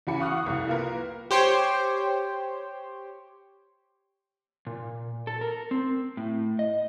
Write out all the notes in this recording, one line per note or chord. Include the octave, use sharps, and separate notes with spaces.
E2 C#3 F#4 G#5 B5 C#7
F5 F#5 C#6 D#6 F6 F#6
F1 C2
A#3 F4 A#4 B4
G4 C5 C#5 G5
A#2
A4
A#4
C4
A2
D#5